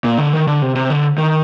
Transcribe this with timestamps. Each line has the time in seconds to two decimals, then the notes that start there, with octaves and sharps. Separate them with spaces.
0.04 A#2
0.18 D3
0.33 D#3
0.47 D3
0.62 C3
0.76 C3
0.90 D3
1.18 D#3